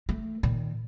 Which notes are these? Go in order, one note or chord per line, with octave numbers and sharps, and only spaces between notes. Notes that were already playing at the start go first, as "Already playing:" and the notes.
A3
A#2 D#3